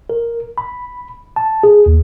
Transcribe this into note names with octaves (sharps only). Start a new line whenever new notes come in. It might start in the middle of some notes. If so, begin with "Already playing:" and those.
A#4
B5
A5
G#4
D#2